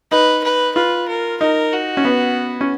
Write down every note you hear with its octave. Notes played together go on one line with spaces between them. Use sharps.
D#4 B4
B4
F4 B4
A#4
D#4 A#4
F#4
C#4
B3
C#4